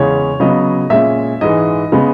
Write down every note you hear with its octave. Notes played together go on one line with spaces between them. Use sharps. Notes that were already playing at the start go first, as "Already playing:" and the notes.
Already playing: E2 C#3 G#3 C#4 C#5
C#3 F#3 B3 D#5
A#2 G#3 C#4 E5
G#2 E3 G#3 D#5
C#3 G#3 B3